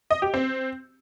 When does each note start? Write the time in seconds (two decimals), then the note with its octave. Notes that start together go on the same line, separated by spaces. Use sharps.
0.11 D#5
0.22 G4
0.34 C4